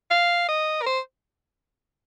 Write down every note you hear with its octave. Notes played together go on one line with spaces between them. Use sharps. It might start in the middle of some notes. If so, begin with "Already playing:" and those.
F5
D#5
A#4
C5